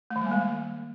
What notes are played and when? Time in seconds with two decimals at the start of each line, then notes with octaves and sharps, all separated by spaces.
0.10 A3
0.16 D#3
0.21 G3
0.26 A#3
0.32 G#3